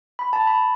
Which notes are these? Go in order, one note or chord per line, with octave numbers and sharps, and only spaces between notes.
B5
A5
B5